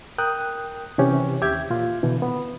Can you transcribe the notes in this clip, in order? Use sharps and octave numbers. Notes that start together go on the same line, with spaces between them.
A#4 G5 D#6 F#6
C3 E3 C#4 G4
D#2 G4 E5 G5 G#6
A#2 F4
B2 D3 E3
B3